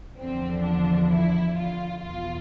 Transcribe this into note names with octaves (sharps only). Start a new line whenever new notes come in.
E2 D3 F3 C4
D4
E4
F4
E2 B2 F4